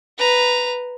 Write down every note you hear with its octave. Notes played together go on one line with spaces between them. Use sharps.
B4 A#5